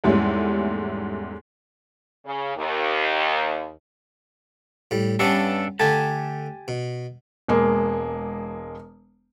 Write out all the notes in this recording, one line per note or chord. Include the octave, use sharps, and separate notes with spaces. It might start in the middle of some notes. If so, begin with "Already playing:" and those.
E2 G#2 G3 A3 C#4
C#3
D#2
A2 G3
G2 G3 B3 C#4 D4 A4
D3 A3 G4 G#5 A5
B2
E1 G#3 A#3